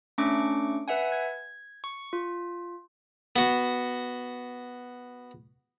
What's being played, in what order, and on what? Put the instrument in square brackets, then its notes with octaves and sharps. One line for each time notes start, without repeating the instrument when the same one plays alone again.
[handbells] A3 C#4 D4 C#6 D6 D7
B4 E5 F#5 G#5
G#6
C#6
F4
[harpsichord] B3 F#4